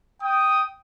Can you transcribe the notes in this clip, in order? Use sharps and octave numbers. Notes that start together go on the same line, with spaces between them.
G5 D#6